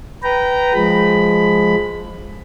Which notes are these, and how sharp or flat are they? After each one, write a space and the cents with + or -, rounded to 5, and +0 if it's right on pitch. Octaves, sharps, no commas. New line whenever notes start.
B4 +0 G5 -20 A#5 +0
F3 +0 G#3 +0 B5 +10